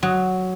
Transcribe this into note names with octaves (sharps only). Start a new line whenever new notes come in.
F#3